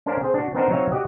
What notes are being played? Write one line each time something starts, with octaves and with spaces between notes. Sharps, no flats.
C#4 D4 A#4 C5 D5 F5
C4 G#4 C5
D4 F#4
B3 C4 D4 D#4 A#4 C5
F#3 C4 D#4 C#5 E5 F5
F#4 G4 D5 D#5 F#5